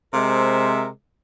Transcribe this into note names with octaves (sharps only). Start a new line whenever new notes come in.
C3 G#3 A#4 C5 E5